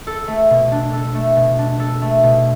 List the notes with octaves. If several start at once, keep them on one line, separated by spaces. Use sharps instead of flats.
A4
A3
B2
D4
A4
A3
B2
D4
A4
A3
B2